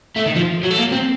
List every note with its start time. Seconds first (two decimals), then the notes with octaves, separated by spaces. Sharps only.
0.16 A3
0.26 D#3
0.36 F3
0.63 F#3
0.71 A3
0.78 A#3
0.92 C4